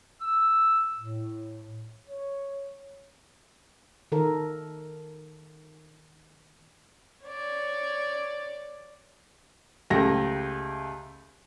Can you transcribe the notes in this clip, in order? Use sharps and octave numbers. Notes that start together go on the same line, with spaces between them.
E6
A2
C#5
D#3 A4 A#4
C#5 D5
C#2 A3 G4 A#6